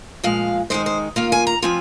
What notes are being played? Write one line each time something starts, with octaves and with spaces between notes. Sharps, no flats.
A#2 F3 G#3 F5
D#3 G#3 D#4 C5
C5
D#3 A#3 F4 F5
G#5
A#5
F3 C4 F4 G#5